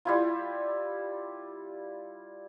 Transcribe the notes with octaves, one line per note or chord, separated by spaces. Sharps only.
G3 E4 F4